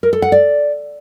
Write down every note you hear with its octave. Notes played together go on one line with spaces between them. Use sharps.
A#4
A4
F#5
D5